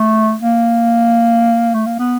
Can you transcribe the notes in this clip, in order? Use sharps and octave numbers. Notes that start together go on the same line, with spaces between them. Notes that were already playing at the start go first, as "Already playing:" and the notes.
Already playing: A3
A#3
A3
A#3
B3